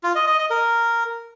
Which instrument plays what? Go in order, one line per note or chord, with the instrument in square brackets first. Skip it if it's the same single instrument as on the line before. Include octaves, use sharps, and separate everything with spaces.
[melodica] F4
D#5
D#5
D#5
A#4